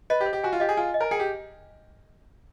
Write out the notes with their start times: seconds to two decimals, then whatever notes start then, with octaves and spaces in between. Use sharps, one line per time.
0.10 B4 D#5
0.21 G4
0.26 C5
0.33 G4
0.43 F#4 G#5
0.53 F4
0.60 G4 D#5
0.69 G#4
0.77 F4 G#5
0.94 D#5
1.01 A#4
1.11 G#4 G5
1.20 G4